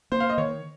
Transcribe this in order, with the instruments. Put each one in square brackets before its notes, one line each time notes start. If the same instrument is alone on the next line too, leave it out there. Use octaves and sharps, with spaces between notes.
[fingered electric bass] A#3 [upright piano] C5
[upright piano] F5
D#5
[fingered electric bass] D#3 [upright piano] C#5